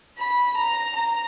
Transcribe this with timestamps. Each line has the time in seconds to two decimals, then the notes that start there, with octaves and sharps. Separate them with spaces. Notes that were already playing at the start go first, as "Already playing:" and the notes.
0.18 B5
0.57 A#5
0.96 A#5